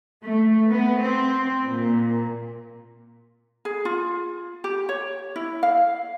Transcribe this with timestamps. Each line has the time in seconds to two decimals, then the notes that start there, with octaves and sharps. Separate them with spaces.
0.23 A3
0.69 B3
1.02 C4
1.67 A#2
3.65 G#4
3.85 F4
4.64 G4
4.89 C#5
5.36 E4
5.63 F5